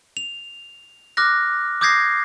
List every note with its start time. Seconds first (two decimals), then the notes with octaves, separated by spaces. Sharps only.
0.17 F7
1.17 D6 F6 F#6 A#6
1.81 D6 D#6 G6 G#6 A#6 C7